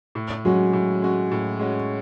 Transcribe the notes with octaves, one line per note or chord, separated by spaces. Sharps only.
A2
F#3 G#3 C#4 F#4
A2
G#3 C#4 F#4
A2
G#3 C#4 F#4